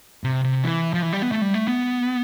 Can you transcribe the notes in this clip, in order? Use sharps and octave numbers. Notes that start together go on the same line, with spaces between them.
C3
C3
E3
F3
E3
G3
B3
A3
G3
A3
B3